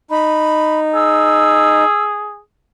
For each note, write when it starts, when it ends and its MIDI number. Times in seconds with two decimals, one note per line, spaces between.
0.10 1.84 63
0.10 0.80 83
0.94 2.41 68
0.94 2.04 88